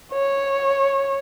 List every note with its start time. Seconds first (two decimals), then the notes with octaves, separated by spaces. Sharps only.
0.12 C#5